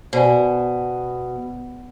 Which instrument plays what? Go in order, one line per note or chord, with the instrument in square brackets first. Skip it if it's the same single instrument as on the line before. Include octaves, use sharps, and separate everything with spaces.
[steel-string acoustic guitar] B2 [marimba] C5 D5 G#5